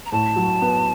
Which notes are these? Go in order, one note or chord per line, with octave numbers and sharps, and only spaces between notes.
A#5
A2 A5
F#3
B3